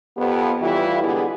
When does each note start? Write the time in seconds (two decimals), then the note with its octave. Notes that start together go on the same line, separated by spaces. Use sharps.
0.16 F2 B3 G4
0.61 A2 E3 G3 E4 F4
1.02 D3 G3 G#3 B3 G4 G#4